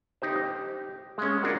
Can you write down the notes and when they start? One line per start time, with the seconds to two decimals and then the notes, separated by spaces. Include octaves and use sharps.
0.22 D#4 G4 C5
0.36 G4
1.18 G#3 C#4
1.43 D4 F4 F#4 A#4 F#5